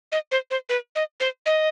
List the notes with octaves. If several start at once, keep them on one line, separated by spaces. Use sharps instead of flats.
D#5
C5
C5
B4
D#5
C5
D#5